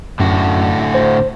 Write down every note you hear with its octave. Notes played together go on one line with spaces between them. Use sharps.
F#2 A2 D3 F#4
C5